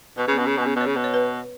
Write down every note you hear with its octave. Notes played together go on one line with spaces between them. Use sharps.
B2 B4
C#3 B3
B2 C#4
C#3
B2 B3
C#3
B2
C#5
C#3
B2
C#5
B4